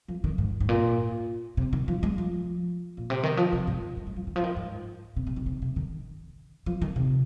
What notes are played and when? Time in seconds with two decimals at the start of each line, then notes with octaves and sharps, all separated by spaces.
0.08 F3
0.24 D#3
0.38 G#2
0.60 G#2
0.69 A#2
1.57 C3
1.73 D#3
1.88 F3
2.03 G#3
2.18 F3
2.97 A#2
3.10 C3
3.23 D#3
3.37 F3
3.52 C3
3.67 G#2
3.97 G#2
4.07 G#3
4.16 F3
4.27 D#3
4.36 F3
4.44 D#3
4.56 G#2
5.16 C3
5.27 C3
5.36 D#3
5.46 C3
5.62 C3
5.76 D#3
6.66 F3
6.81 D#3
6.96 C3